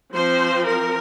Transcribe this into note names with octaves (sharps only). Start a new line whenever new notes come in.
F3 C4 C5
A#4